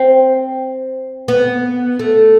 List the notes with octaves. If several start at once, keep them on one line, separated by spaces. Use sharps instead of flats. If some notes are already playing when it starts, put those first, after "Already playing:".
Already playing: C4
B3
A3